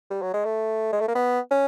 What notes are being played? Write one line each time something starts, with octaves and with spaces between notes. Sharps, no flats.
G3
F#3
G#3
A3
G#3
A3
A#3
B3
C#4